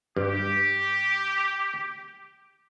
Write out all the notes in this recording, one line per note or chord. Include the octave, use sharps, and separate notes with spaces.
G2 G4